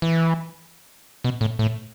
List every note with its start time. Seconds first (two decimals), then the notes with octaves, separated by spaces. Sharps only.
0.02 E3
1.24 B2
1.41 A2
1.59 A2